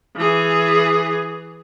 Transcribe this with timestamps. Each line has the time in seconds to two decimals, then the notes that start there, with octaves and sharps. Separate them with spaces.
0.16 E3 G#4